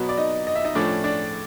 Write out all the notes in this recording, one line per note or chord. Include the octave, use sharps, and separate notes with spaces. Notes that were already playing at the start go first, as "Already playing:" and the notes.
Already playing: B2 F#3 B3
D5
D#4 D#5
D#5
E5
D#4 D#5
A2 F3 A3 C#4 D4 D5
D4 D5